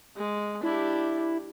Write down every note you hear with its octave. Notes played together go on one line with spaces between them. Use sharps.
G#3
D4 E4 G4